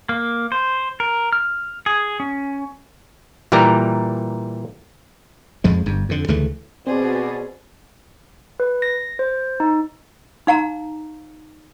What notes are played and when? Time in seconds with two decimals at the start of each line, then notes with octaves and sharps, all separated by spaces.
0.09 A#3
0.52 C5
1.00 A#4
1.33 F6
1.86 G#4
2.20 C#4
3.52 A#2 E3 G3 G4 A#4 A#5
5.64 F2 F3 G#3
5.86 G1 G2
6.09 F2 D3
6.28 D2 C#3 E3 A3
6.87 B2 C4 G#4 C5 D5
8.60 B4
8.82 A#6
9.19 C5
9.60 D#4
10.47 D#4 F5 A#5